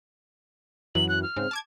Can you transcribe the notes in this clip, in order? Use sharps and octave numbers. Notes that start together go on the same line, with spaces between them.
F#2 E3 F#3 F#7
F#6
F6
G#2 C#3 C4
A5 D6 G#6